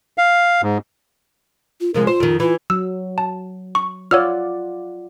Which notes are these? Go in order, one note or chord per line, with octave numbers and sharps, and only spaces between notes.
F5
G#2
F4
C3 F3 G#3 A#4
F4 C5
F2 D#3
E3 F4
F#3 E6
A5
C#6
F4 C#5 D5 F#5 E6 F6